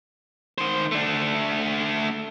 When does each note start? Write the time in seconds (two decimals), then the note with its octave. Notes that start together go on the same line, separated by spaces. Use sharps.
0.58 D#3 C5
0.92 A3 D4